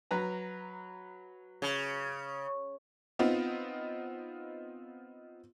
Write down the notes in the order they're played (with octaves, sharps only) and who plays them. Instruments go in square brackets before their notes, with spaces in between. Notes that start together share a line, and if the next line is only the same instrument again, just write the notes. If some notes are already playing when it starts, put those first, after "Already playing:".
[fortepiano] F#3 B4 A#5
[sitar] C#3
[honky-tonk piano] B3 C4 D#4 F4